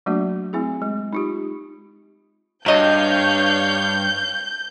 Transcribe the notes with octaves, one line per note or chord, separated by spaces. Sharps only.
F#3 A3 A#3 D4 F#4
A3 C4 E4 G#4
G#3
D#4 F4 G4
G2 F#3 C#5 D#5 F5 G6